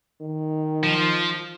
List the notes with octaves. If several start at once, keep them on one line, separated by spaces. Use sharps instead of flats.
D#3
F3